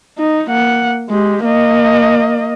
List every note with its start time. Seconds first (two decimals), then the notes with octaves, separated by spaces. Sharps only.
0.18 D#4
0.50 A#3 F#5
1.09 G#3 G4
1.44 A#3 D#5